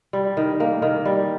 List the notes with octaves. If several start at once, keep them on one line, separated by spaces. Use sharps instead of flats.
G3
D#3
A#3
D#3
G3